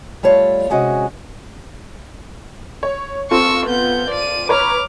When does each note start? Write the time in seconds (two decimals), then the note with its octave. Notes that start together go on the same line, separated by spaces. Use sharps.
0.23 G3 A3 F4 C#5 D5 F5
0.70 C3 G#3 C#4 F#4 D#5
2.83 C#5
3.31 C4 F4 A4 C#6 E6
3.67 B3 G6
4.10 D5 D#7
4.49 B4 C#5 A#5 D6 F6